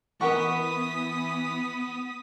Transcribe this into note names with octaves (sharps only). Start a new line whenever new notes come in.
E3 B3 A#4 F#5 C#6 D#6 B6